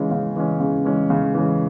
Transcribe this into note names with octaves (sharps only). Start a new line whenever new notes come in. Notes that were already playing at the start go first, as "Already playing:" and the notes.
Already playing: C#3 E3 G#3 C#4
C#3
E3 G#3 C#4
C#3
E3 G#3 C#4
C#3
E3 G#3 C#4